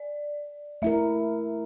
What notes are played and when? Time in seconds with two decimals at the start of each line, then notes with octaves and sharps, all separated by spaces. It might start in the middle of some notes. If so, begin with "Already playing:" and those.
Already playing: D5
0.82 A3 E4 A#4 E5